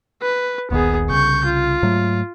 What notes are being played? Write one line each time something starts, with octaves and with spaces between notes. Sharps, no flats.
B4
D#1 A#1 D#2 B3 G#4
C2 C#3 C#6 G6
F4
G#2 F#3 A3